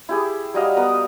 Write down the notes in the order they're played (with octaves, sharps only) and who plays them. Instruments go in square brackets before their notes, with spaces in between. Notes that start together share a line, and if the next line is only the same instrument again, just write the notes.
[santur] E4 G4 G#4
F#3 G3 D#5 F5
B3 A#4 D#6